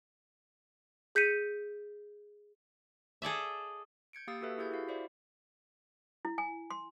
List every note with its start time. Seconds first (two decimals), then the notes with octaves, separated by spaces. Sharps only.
1.15 G#4 G6 B6 C#7 D#7
3.22 G#4 A4 D5 E5
4.13 G6 G#6 C#7 D7
4.27 A#3 G4 F5 D#6 E6 A6
4.41 F#4 G4 A4 B4 E5
4.58 E4 G4 G#4 G6 G#6
4.71 E4 F#4 F5
4.88 F#4 C5 D5 E5
6.25 E4
6.38 G#5
6.70 C6